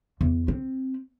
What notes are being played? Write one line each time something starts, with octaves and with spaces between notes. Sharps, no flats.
E2
C4